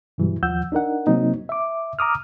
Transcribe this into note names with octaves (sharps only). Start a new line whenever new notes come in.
G2 B2 E3 F#3 G3
D#2 F3 F#5 E6 G6
D4 D#4 A#4 F#5
C3 F#3 A#3 C4 D#4
E5 D6
A#5 D6 D#6 F6